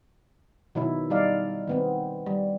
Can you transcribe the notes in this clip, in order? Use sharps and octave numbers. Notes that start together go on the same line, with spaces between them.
B2 D#3 F#3 E4
G3 D#4 D5 F5
D#3 B3 C4
G3